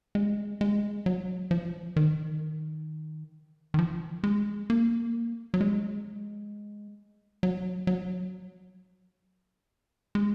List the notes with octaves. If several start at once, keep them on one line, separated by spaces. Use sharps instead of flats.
G#3
G#3
F#3
F3
D#3
D#3
F3
G#3
A#3
F#3
G#3
F#3
F#3
G#3